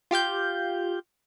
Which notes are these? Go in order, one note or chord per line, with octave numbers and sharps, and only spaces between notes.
F4 G4 F5 G6